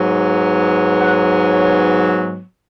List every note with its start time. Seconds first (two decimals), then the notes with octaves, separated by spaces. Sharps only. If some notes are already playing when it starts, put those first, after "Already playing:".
Already playing: G#2 F#3 B3
1.00 F#5
1.35 C#5